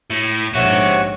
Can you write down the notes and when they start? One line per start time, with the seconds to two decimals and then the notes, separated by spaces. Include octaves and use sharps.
0.10 A2
0.54 A#1 G#2 C5 C#5 E5 F#5 C#6